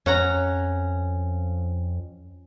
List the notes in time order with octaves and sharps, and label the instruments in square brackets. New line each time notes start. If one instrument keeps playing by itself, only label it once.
[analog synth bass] F2 [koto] C#4 F#5 A#5